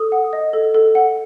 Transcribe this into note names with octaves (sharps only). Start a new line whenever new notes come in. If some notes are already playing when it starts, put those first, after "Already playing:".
Already playing: A4 D#6
F#5
D#5
A4
A4
F#5